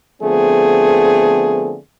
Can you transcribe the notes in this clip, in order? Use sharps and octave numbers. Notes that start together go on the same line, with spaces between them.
D3 F3 A3 B3 C4 G#4